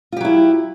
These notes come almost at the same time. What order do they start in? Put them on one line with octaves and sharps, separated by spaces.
F4 G4 F#3 E4